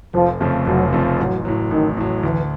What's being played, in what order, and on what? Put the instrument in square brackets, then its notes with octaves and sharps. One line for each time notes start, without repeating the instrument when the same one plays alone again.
[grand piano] F1 [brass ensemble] F3
[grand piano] F2 C#3 F3 A3
[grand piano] F1 [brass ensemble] F#3
[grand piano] F2 C#3 F3 A3
[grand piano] A1 [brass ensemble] F#3
[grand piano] A2 F#3
[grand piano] A1 [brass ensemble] D#3
[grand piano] A2 F#3
[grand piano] D2 [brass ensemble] E3